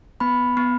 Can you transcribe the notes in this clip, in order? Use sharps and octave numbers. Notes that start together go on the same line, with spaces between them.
B3 B5
B3